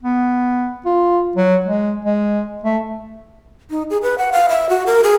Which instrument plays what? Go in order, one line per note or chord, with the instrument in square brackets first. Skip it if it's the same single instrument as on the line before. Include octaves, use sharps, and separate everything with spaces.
[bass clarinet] B3
F4
F#3
G#3
G#3
A3
[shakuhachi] D#4
G#4
B4
F#5
F5
E5
F#4
A#4
G#4